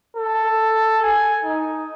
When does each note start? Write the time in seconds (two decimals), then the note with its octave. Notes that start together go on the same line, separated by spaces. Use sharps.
0.17 A4
1.03 G#5
1.44 D#4